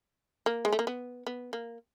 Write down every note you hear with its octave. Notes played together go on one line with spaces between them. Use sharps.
A#3
G#3
A3
A#3
B3
B3
A#3